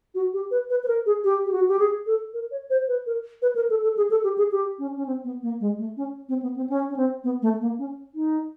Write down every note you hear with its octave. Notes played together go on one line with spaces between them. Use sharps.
F#4
G4
B4
B4
B4
A#4
G#4
G4
G4
F#4
G4
G#4
A4
A#4
C#5
C5
B4
A#4
B4
A#4
A4
A4
G#4
A4
G4
G#4
G4
C#4
C#4
C4
B3
A#3
G#3
A3
C#4
C4
B3
C4
C#4
C#4
C4
B3
A3
A#3
C#4
D#4